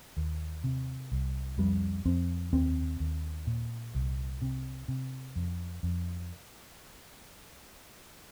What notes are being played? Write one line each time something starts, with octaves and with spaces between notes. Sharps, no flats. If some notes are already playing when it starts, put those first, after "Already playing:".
D#2
C3
C2
F2 G3
F2 C4
D#2 C4
D#2
A#2
C2
C3
C3
F2
F2